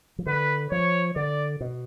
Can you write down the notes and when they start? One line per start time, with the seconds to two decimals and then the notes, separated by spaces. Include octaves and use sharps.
0.19 F3
0.26 D3 B4
0.71 F3 C#5
1.16 D3 D5
1.61 B2